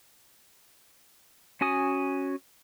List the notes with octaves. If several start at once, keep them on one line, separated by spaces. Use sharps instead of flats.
C#4 F#4 G#5 D#6